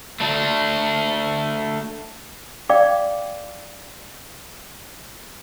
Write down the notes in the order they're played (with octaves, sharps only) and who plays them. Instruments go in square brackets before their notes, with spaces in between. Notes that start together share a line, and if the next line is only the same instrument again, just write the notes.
[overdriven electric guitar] A3 D4
[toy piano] D5 F5 G5 D6